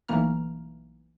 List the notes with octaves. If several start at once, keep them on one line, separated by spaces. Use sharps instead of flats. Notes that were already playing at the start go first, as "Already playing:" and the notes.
B1 E3 A3 A#3 A#5 F6